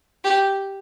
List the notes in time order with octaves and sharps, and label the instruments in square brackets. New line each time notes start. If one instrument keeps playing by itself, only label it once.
[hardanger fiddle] G4